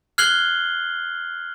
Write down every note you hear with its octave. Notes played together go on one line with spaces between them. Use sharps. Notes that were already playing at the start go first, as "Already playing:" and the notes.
F6 F#6 G#6 C7 F#7 G7